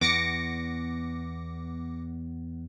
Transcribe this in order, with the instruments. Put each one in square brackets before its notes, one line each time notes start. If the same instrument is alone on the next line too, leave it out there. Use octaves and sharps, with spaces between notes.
[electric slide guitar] E2 B3 [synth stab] D6 A#6 C#7